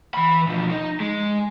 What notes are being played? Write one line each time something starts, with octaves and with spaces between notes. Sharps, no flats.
E3 B5
B2 F3
D#4
G#3